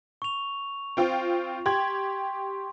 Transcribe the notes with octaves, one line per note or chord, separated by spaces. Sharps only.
C#6 F7
C4 F4 G5
G4 C6 G#6